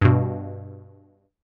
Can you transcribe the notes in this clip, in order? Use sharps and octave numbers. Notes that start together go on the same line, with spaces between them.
G2 B2